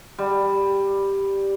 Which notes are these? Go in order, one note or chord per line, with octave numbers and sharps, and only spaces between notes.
G3